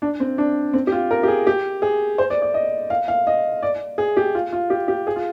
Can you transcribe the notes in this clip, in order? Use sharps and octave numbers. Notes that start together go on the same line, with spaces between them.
D4
C4
D4
C4
G4
F4
A#4
G4
G#4
G4
G#4
C5
D5
D5
D#5
F5
F5
D#5
D5
G#4
G4
F4
F4
G4
G4
G#4
F4